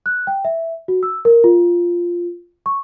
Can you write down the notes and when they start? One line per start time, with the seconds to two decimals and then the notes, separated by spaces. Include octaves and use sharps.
0.06 F#6
0.27 G5
0.45 E5
0.88 F#4
1.03 E6
1.25 A#4
1.44 F4
2.66 C#6